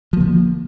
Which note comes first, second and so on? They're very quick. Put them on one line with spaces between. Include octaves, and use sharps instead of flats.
F3 A#3 D3